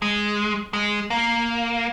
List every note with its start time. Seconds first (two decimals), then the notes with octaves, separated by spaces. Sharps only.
0.02 G#3
0.73 G#3
1.10 A#3